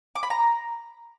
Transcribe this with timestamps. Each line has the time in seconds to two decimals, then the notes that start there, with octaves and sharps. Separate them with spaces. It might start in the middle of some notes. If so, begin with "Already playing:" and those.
0.15 D6
0.23 B5
0.30 A#5